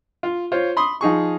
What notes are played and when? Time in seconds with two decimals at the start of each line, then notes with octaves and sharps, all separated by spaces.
0.23 F4
0.52 F4 C5 C#5
0.77 B5 C6 D#6
1.01 F3 D#4 G#4 C#6